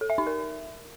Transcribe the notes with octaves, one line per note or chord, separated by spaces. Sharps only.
A4
E5
D#4
A#4